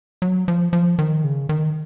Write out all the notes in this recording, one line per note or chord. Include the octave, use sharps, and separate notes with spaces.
F#3
F3
F3
D#3
C#3
D#3